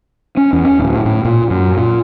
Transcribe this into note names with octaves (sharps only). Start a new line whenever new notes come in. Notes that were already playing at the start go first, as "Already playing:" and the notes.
C#4
E2
C#4
D1
A2
A2
A#2
F#2
A#2